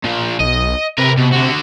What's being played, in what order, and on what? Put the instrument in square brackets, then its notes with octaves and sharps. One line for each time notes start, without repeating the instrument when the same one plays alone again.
[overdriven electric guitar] A#2 F3
[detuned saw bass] B1 [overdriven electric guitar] D#5
[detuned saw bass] C3 [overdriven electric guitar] A#4 B4
[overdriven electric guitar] B2
D3 F#4